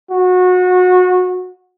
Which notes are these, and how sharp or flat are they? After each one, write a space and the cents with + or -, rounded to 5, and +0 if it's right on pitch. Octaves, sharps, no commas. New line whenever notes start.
F#4 -25